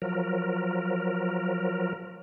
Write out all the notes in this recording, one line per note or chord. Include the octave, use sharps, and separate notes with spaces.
F3 F#3 A#4